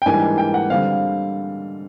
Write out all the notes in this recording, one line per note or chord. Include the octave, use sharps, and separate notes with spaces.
G5
G#2 E3 G3 A#3 D4 G#5
G5
F#5
D3 G3 C4 F5